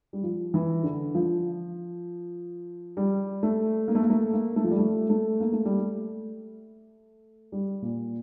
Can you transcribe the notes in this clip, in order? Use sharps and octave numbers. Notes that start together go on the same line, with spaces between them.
G3
F3
E3
D3
F3
G3
A3
A#3
A3
A#3
A3
A#3
A3
F3
G3
A3
A3
A#3
A3
G3
A3
G3
A#2